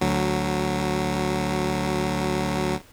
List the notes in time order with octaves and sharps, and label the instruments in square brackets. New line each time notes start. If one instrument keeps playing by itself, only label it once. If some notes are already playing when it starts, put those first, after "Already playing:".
[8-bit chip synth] D2 F#3